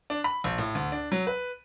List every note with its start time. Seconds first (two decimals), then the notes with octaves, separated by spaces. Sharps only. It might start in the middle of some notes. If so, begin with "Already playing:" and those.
0.10 D4
0.24 B5
0.44 A#1
0.58 A2
0.75 D2
0.92 D4
1.12 F#3
1.27 B4